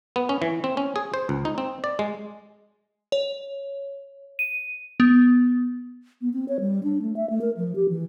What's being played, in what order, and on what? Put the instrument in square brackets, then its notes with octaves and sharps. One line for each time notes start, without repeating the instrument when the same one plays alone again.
[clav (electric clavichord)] B3
C#4
E3
C4
C#4
G#4
C5
C#2
D#4
C4
D5
G#3
[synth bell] C#5
D#7
B3
[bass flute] B3
C4
C#5
G3
D4
A3
E5
A3
A#4
F3
G4
E3